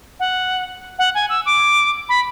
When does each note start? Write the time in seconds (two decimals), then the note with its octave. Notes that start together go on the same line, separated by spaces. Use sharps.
0.20 F#5
0.99 F#5
1.15 G#5
1.29 E6
1.46 D6
2.09 B5